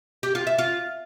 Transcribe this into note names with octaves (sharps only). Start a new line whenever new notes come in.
G4
F4
E5
F4